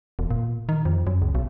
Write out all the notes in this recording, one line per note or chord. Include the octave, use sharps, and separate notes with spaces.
E1
A#2
D#3
F2
F#2
C#2
B1